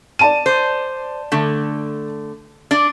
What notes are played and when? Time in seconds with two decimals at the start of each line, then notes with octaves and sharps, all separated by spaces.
0.19 D5 A5 D#7
0.46 C5
1.32 D3 A3
2.71 D4 D5